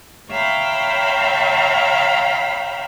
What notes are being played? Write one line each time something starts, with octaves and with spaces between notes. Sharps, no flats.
C#5 E5 F5 G5 A#5 B5